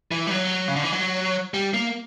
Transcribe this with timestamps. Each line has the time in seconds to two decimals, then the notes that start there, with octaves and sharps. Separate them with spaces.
0.11 E3
0.27 G3
0.31 F#3
0.68 C#3
0.76 D3
0.84 E3
0.92 F#3
1.54 G3
1.74 A#3